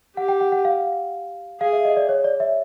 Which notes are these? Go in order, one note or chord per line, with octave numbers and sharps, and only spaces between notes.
G4 F#5
G5
F#5
F#5
F5
G#4 F5
E5
D#5
D5
C#5
D5
E5